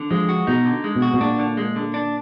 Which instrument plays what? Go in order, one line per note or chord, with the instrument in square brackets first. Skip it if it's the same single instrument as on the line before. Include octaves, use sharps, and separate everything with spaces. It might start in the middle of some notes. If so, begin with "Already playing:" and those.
Already playing: [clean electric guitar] D3
[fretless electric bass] F3 [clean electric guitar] G#3
[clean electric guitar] F#4
[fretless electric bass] B2 [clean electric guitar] D#4
[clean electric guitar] D3
G#3
[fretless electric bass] B2
[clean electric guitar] F#4
[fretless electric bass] B2
[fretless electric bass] A#2 [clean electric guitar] D4
[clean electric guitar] D3
G#3
D3
D4